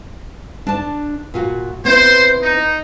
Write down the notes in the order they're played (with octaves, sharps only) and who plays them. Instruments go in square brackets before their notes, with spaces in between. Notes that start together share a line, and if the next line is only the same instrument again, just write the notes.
[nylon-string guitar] D4 A5
A#2 F4 F#4
[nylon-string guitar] B3 C4 E4 [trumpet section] C5
[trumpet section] D#4